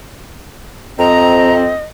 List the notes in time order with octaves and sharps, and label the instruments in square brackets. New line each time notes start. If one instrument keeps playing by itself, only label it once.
[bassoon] F2 [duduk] C4 [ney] D#5 [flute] A#5